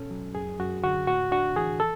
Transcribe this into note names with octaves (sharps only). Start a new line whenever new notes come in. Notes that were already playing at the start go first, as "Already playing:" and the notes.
Already playing: B2 C#4 A4
F#3
F#2 G#4
F#2 F#4
D3 F#4
A2 F#4
D4 F#4
E3 G#4
A4